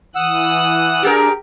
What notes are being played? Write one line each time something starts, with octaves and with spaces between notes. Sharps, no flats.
E3 F#5 D#6 E6 F#6
D4 G4 G#4 A#4